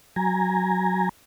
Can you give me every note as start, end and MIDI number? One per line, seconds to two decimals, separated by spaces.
0.16 1.09 54
0.16 1.09 80
0.16 1.09 82